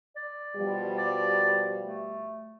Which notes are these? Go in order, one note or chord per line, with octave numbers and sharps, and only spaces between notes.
D5
B2 F3 G3
D5
A3